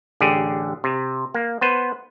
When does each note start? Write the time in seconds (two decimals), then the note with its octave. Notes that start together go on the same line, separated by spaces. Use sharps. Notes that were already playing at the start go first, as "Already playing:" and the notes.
0.20 A1 D3 G4 G#4
0.84 C3
1.34 A#3
1.61 B3 B4 C5